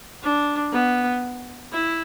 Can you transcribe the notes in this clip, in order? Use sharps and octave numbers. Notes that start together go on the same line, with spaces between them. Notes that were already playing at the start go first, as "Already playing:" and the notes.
D4
B3
E4